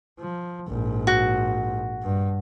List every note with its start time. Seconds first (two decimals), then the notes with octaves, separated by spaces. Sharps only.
0.20 F3
0.68 A#1 G#2
1.07 F#4
2.02 G2